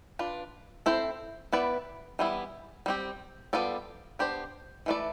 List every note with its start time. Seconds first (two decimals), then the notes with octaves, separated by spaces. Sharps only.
0.19 D4 F4 B4
0.86 C4 E4 A4 C5
1.52 B3 E4 B4 D5
2.19 E3 G3 B3 E4
2.86 G3 C4 G4
3.53 G3 B3 F4 A4 D5
4.19 B3 D4 G4 C5
4.86 E3 A3 E4 B4 D5